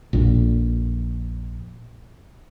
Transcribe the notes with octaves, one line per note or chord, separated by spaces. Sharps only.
A#1 F2 A#2